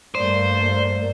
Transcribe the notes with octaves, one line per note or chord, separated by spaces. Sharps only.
G2 A3 A#3 C5 D5